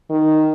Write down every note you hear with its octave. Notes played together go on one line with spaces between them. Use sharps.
D#3